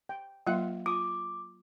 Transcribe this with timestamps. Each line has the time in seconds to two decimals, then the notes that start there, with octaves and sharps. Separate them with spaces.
0.09 G5
0.47 F#3 A#3 F4 E5 F#5
0.86 F4 D6 D#6